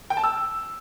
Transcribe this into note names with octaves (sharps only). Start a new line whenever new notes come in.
G5
A5
E6